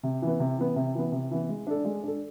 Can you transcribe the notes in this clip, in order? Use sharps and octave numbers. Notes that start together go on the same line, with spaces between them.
C3
E3 B3
C3
E3 B3
C3
E3 B3
C3
E3 B3
G#3
D4 A4
G#3
D4 A4